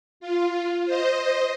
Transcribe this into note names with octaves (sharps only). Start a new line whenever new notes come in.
F4
C5 D#5